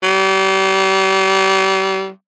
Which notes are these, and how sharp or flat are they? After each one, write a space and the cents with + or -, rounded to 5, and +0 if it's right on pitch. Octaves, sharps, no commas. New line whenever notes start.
G3 -35